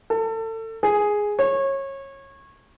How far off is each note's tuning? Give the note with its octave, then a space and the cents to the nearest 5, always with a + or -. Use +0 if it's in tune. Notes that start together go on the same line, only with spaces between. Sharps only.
A4 +30
G#4 +0
C#5 -25